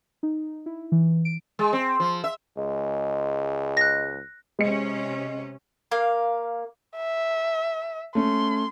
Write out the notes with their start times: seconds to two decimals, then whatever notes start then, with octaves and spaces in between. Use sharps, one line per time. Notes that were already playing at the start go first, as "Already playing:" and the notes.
0.23 D#4
0.66 E4
0.92 E3
1.25 D7
1.59 G#3
1.73 C4
2.00 F3
2.24 E5
2.57 C#2 G#3
3.77 F#6 A#6
4.59 C3 G#3 C#4 C#7
5.92 A#3 F5
6.97 E5
8.15 A3 C#4 C6